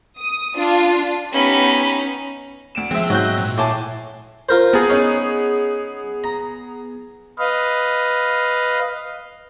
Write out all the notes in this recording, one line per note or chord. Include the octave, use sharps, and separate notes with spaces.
D#6
D4 F4
B3 C#4 D#4 G4 B5
D2 D7 E7
F3 G#3 C4 E5
G#2 F#3 C4 D#5 F#6 G6
A#2
A2 G#5 A5 C6 D6
F4 A#4 C5
B3 G#4 A5 A#5
C#4 D#4
A#5
B4 D#5 F5